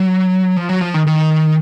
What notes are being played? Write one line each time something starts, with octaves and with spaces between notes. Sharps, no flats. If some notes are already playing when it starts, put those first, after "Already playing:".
Already playing: F#3
F3
F#3
F3
D#3
D#3